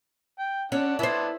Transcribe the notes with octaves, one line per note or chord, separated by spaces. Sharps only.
G5
C#4 D4 F#5
B3 E4 C5 D5 A5